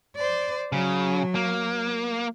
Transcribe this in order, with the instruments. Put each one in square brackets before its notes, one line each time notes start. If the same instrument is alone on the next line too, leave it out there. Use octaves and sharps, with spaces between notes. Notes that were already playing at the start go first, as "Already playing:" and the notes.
[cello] C5 D5
[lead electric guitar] C#3 [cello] F#3
[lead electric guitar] A#3